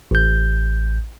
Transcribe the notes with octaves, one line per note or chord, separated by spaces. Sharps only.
A1 G6